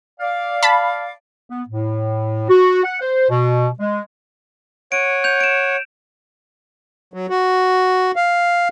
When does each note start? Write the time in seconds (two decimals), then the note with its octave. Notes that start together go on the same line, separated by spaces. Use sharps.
0.20 D5 F5
0.63 A5 B5
1.50 B3
1.68 A2
2.49 F#4
2.84 F#5
3.01 C5
3.30 B2
3.79 G#3
4.92 C#5 F#5 D7 D#7
5.24 G6 F7
5.40 D7 E7
7.14 F#3
7.30 F#4
8.16 F5